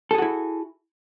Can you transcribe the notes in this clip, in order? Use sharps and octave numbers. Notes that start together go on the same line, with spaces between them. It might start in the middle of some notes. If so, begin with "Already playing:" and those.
E4 F#4 G#4 A4